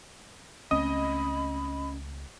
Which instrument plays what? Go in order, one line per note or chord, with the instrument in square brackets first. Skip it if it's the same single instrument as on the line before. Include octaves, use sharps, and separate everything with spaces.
[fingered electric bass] C#2 A3 C4 [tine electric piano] C#4 [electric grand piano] D#5 D#6 [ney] B5